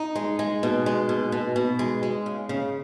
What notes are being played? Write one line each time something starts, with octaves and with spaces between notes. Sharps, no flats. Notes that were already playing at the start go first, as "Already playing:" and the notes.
Already playing: D#4
G#3
G#3
B2
G#3
B2
B2
B2
G#3
G#3
C#3
C#3